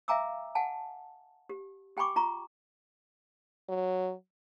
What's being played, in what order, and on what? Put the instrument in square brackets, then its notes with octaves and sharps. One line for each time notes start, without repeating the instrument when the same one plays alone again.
[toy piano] E5 F5 G#5 A#5 D6 E6
F#5 G#5 A5
G4
G4 G5 G#5 B5 C#6 D6
F4 A#5 C#6
[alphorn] F#3